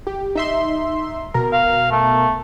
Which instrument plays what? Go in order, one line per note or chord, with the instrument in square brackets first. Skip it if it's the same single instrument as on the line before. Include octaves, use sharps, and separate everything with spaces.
[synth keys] G4
D#4 E5 C6
B2 A#4
[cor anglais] F5
A3